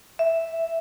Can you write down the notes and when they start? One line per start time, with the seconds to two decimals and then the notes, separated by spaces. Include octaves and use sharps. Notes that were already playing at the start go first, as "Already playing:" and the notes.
0.19 E5